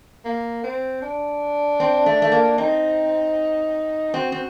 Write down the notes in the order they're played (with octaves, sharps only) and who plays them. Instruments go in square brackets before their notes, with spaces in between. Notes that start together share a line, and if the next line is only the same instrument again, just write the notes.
[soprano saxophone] A#3
C4
D4
[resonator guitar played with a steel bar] C4
A3
A3
A#3
[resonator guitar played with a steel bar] C4 [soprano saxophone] D#4
[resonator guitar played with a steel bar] C4 [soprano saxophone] F#4
[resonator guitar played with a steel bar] C4